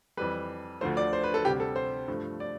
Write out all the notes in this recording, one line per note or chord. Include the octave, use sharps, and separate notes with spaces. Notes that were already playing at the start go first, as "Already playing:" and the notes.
F2 E3 G3 B4
D2 D3 F3 A3 C5
D5
C5
B4
A4
D2 C3 G3 G4
A4
C5
G2 F3 A3
D5